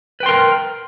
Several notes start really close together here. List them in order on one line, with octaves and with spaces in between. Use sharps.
B4 G5 C6 A#4